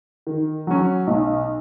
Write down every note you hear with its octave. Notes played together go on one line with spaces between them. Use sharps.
D#3
F#3 C#4
B1